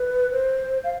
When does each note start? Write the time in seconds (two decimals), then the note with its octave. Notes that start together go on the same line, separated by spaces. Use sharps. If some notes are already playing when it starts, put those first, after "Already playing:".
Already playing: B4
0.32 C5
0.84 F5